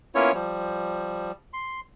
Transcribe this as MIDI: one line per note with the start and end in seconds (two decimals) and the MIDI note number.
0.15 0.32 58
0.15 0.32 59
0.15 0.32 61
0.15 0.32 64
0.15 0.32 65
0.15 0.32 73
0.34 1.32 53
0.34 1.32 55
1.53 1.80 84